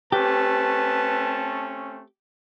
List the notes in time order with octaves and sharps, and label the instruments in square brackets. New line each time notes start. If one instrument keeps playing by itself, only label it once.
[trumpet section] A3 C4 C#4 [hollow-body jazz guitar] G4 [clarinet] B4 [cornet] A5